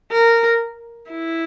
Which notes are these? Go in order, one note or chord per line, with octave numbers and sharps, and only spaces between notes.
A#4
E4